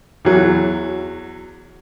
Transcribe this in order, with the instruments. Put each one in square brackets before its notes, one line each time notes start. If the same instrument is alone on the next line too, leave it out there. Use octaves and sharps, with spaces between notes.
[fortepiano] E2 F#3